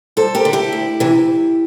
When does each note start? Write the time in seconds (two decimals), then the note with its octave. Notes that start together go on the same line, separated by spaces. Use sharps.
0.17 G2 A4 C5
0.35 G4 A#4
0.45 D3
0.53 E4 G4
0.73 D2
1.00 C3 E3